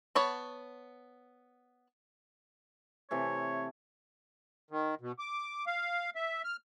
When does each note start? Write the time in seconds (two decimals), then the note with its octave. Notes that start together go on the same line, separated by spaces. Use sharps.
0.15 B3 C#5 F#5 A5
3.11 C3 E3 A3 C#5
4.71 D#3
5.01 B2
5.19 D6
5.67 F5
6.15 E5
6.44 F6